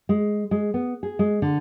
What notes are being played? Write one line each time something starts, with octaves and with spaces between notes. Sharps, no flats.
G#3
G#3
B3
G#4
G#3
D3